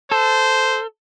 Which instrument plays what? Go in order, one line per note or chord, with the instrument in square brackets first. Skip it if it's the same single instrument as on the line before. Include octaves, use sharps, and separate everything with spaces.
[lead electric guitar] A4 [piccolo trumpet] C5